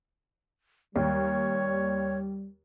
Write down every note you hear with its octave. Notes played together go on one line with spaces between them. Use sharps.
D#2 G3 C#5